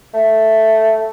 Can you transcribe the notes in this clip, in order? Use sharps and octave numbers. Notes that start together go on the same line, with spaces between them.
A3